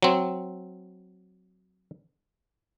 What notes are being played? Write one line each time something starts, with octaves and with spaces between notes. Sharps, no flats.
F#3 C4